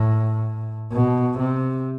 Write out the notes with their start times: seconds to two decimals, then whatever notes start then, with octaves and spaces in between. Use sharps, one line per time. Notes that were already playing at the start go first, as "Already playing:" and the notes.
Already playing: A2
0.92 B2
1.39 C3